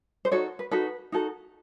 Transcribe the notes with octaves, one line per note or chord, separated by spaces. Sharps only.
C5
D#4 F#4 A4 C#5
B4
D#4 F#4 A4 B4
D#4 F#4 A4